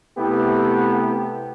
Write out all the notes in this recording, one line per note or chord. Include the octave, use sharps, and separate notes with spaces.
C3 A3 B3 E4 G4